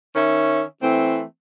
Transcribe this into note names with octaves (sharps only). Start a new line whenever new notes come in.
D#3 C#4 E5
E3 A3 C4